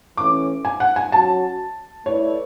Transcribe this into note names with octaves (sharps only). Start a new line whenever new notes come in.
E3 A3 C#4 D6
G#5
F#5
G#5
F#3 C#4 F#4 A5
A3 E4 B4 C#5 D5